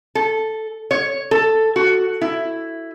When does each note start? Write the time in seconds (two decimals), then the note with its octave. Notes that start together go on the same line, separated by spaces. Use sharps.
0.15 A4
0.91 C#5
1.31 A4
1.76 F#4
2.21 E4